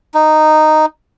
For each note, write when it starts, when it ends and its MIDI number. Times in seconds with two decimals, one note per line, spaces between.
0.14 0.86 63